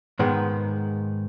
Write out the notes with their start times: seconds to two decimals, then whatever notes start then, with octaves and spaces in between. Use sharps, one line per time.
0.19 G#2 D#3 G#3 B3